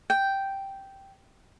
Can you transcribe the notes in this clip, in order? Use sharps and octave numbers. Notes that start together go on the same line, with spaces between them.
G5